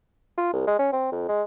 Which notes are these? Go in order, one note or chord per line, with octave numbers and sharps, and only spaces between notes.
F4
C2
G#3
C#4
C4
F2
G#3